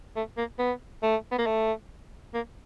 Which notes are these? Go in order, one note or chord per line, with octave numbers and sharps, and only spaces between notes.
A3
A#3
B3
A3
B3
A#3
A3
A#3